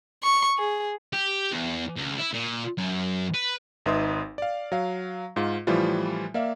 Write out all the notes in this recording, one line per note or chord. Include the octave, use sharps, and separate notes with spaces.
C#6
G#4
G4
E2
C#2
E4
A#2
F#2
B4
G#1 D#4 B4 E5 C6 D#6
D5 F5
F#3 F5
G#2 F4
A2 E3 F3 G3 F4
A#3 D5 E5 F5